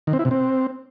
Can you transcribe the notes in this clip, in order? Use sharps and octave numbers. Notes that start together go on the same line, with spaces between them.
D#3
C4
E4
C3
C4